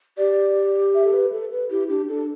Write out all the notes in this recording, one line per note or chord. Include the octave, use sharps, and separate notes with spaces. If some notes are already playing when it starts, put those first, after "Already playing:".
G4 D5
E5
A4
B4
A4
B4
E4 G4
D4 G4
D4 A4